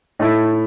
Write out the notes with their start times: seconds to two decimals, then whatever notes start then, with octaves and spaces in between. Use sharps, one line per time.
0.19 A2 A3 E4